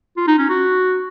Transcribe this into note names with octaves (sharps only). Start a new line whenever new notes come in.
F4
D#4
C#4
F#4